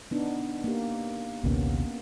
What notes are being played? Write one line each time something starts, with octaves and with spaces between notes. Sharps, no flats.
B3 D4 D#4
A#3 G4
A#1 D#2 C3 A#3 B3 C#4